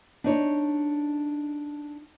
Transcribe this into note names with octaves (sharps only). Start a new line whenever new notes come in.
D4 D#4 C#5